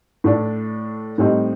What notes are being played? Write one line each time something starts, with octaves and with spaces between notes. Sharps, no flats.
A2 A3 D4
A2 G3 C4 D#4